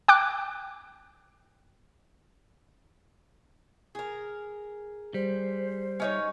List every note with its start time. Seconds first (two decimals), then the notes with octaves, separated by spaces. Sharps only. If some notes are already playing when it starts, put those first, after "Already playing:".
0.08 G5 D6 F#6
3.95 G#4 A#4
5.14 G3 C5
6.00 C#4 D#4 C#5